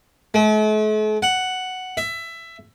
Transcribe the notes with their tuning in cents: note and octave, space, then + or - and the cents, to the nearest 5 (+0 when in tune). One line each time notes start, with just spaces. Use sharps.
A3 -45
F#5 +5
E5 +15